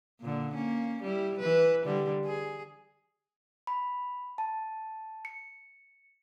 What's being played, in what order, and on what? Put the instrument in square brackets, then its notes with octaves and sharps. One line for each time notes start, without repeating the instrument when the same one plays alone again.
[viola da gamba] A#2 D3
A#3 C#4
G3 E4
E3 B4
D3 G3
G#4
[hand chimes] B5
A5
C#7